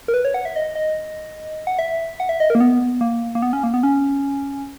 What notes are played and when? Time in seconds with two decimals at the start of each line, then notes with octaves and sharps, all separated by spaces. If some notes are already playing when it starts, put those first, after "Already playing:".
0.08 A#4
0.14 B4
0.25 C#5
0.34 F#5
0.45 E5
0.56 D#5
0.75 D#5
1.67 F#5
1.79 E5
2.20 F#5
2.29 E5
2.40 D#5
2.50 A#4
2.55 A#3
2.60 B3
3.01 A#3
3.35 A#3
3.42 B3
3.53 C#4
3.63 A#3
3.74 B3
3.83 C#4